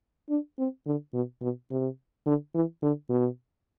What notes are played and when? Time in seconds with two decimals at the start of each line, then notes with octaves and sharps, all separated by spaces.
0.29 D4
0.58 C4
0.86 D3
1.13 B2
1.42 B2
1.71 C3
2.26 D3
2.55 E3
2.82 D3
3.09 B2